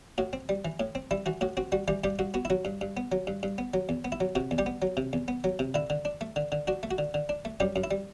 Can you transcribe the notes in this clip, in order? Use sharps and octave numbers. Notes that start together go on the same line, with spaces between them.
A2 F#4
C4
G3
E3
A2
C4
G3 E4
E3 F#4
A2 F#4
C4 F#4
G3 F#4
E3 G3 G4
G2 G3 G4
G2 F#4
B3 F#4
E4
F#3 F#4
G2
G2
B3
F#3
G2
G2
B3
F#3
E2
B3
E4
F#3
C3 F#4
E2
G3 G4
B3
F#3
C3
E2
B3
F#3
C3
D3 E4
D3
D4
A3
D3
D3
D4 F#4
A3
F#4
D3
D3
D4
A3
F#2 G3 G4
F#2
E4
G3